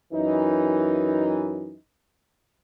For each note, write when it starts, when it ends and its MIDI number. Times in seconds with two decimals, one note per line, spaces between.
0.13 1.74 42
0.13 1.74 52
0.13 1.74 63